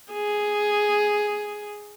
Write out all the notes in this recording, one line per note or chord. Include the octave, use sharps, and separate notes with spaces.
G#4